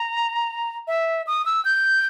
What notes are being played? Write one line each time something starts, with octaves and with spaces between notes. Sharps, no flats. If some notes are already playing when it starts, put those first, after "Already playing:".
Already playing: A#5
E5
D#6
E6
G6